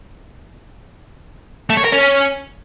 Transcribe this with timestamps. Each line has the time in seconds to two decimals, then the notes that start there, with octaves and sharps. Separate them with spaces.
1.70 A3
1.77 C#5
1.85 A#4
1.92 C#4